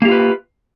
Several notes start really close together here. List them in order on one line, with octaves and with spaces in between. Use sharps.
A#3 G4 F4 B4